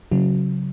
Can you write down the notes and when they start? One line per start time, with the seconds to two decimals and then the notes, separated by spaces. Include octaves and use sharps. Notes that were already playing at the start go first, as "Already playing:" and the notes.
0.12 C#3 F#3